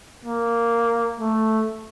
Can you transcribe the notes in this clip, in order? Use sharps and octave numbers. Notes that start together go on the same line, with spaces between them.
A#3
A3